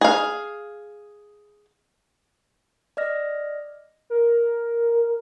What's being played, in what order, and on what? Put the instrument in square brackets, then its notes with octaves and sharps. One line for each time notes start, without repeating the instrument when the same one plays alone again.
[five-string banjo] G#4 F5
[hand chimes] D5 D#5 F6 A#6
[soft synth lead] A#4